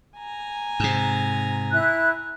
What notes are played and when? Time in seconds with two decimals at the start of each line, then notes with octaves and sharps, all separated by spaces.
0.17 G#5 A#5
0.80 G#2 C3
1.72 E4 F#6